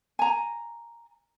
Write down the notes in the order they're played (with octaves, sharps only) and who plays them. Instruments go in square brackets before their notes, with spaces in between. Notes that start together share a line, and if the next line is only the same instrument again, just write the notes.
[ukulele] G#5 A#5